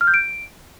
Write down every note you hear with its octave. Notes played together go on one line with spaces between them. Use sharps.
F6
G6
D7